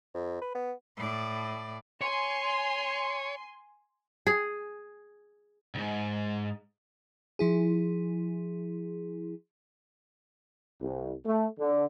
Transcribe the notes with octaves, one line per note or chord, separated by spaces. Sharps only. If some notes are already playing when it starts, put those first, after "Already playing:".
F2
B4
B3
A2 D5
C#5 G#5 C6
G#4
C2 G#2
F3 E4 G#4
C2
A3
D3